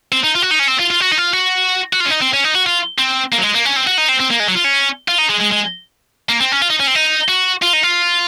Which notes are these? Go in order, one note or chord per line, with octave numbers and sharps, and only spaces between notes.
C4
D#4
F4
F#4
D#4
C#4
C4
F4
F4
F#4
D#4
F4
F#4
F#4
F4
C#4
D#4
C4
C#4
D#4
F#4
F4
C4
A#3
F#3
G#3
A#3
C#4
C4
F#4
D#4
C4
C4
A#3
G#3
F#3
F4
C#4
F4
D#4
G#3
G#3
G#3
A#3
C4
C#4
F4
D#4
C#4
C4
D#4
F#4
F4
D#4
F4